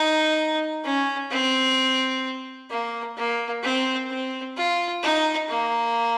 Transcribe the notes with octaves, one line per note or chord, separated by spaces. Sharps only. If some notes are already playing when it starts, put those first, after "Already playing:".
Already playing: D#4
C#4
C4
A#3
A#3
C4
C4
F4
D#4
A#3